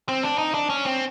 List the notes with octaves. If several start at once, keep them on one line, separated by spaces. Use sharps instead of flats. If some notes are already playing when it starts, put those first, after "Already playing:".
C4
D4
D#4
D4
C#4
C4